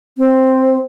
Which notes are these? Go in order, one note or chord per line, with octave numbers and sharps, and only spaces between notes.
C4